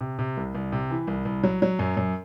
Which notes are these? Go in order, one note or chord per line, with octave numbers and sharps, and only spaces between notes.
C3
C3
C2
C2
C3
E3
C2
C2
F#3
F#3
F#2
F#2